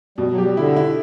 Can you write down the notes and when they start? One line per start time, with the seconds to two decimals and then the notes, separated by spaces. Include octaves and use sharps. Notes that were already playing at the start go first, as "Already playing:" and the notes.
0.18 B2 G3
0.31 F#3
0.38 G4
0.44 G3
0.57 D3 E4
0.76 E4